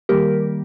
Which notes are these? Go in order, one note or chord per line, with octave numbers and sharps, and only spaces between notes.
D#3 G3 A#3 G4 A#4